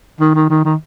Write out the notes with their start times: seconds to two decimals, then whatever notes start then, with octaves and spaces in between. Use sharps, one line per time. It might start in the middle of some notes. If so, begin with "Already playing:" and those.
0.20 D#3
0.35 D#3
0.49 D#3
0.65 D#3